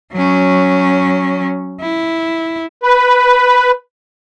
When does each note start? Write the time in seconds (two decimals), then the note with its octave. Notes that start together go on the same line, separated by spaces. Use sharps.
0.13 F#3 C#4
1.81 E4
2.83 B4